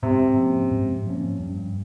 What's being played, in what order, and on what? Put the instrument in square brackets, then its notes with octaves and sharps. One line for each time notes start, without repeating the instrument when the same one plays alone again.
[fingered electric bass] G#2 [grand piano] C3
[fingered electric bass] F3 A#3 C#4
G#2
F3 A#3 C#4
G2